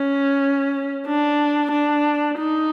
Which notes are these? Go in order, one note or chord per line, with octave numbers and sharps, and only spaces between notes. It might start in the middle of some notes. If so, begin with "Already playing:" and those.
Already playing: C#4
D4
D4
D#4